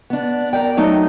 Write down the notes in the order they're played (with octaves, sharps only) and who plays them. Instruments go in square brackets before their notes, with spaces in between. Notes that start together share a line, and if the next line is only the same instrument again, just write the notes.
[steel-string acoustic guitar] B3 D4
A#4 C5 D5 G5
F#3 A3 D#4